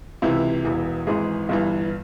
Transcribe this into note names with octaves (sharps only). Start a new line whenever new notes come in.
C#2 C3 E3 E4
E1 E2 E3
G#1 G#2 E3 G#4
G1 G2 E3